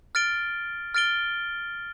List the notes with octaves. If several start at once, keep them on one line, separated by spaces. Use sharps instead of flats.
F6 A6 D7 G7
F6 A6 D7 G7